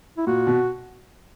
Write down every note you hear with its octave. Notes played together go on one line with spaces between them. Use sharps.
E4
A#2 F#4
B2